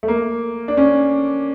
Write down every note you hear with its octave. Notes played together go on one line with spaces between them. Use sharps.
A3
A#3
D4
C#4